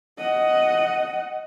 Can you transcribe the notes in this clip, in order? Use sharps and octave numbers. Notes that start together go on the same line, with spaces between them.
D#5 F#5